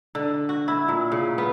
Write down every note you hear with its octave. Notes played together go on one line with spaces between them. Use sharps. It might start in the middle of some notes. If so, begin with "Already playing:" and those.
D3
F#4
E4
A#2
C#3
B3